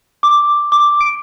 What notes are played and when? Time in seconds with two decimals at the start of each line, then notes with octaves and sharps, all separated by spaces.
0.23 D6
0.72 D6
1.01 D7